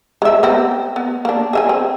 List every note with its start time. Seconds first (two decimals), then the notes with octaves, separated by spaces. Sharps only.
0.22 G#3 E5
0.43 B3 C4 G4
0.96 B3
1.25 A#3 D4
1.53 G#4 E5 G#5
1.69 C4